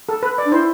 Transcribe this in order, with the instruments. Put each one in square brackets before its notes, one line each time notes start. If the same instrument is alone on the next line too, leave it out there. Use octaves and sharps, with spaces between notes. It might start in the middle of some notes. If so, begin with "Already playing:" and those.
[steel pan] A4
B4
D5
[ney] D4
[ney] E4 [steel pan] C5